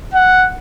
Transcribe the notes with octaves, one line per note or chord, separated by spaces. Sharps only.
F#5